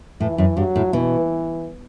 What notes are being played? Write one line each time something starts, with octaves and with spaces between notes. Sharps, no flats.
A2 E3
F#2
G2 F#3
A2
B2 E3